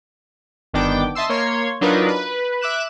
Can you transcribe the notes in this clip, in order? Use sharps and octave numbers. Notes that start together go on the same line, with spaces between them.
G1 D#3 B3 D4 G5 D6
D#5 E5 A5 C6 E6
A#3 C#5 C6 G#6
F#3 D4 D#4 F4 A#4 B4
B4
E5 D6 F#6 E7